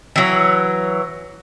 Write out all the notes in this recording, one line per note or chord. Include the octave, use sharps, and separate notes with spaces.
E3 F#3